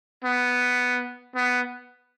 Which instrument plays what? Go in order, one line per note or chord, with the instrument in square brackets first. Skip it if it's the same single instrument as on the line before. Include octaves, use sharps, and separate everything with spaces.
[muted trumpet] B3
B3